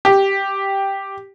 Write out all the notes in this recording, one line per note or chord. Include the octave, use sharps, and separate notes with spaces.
G4